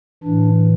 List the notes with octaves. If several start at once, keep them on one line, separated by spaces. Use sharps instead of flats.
A2 E3 D4